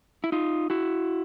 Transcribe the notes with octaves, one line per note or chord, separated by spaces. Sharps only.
E4
D#4 F4
E4 F#4